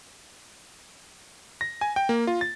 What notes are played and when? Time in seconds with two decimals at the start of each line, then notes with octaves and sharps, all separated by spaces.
1.61 A#6
1.81 G#5
1.96 G5
2.09 A#3
2.27 F4
2.41 A6